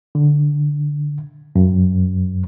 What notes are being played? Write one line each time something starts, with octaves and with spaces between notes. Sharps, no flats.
D3
F#2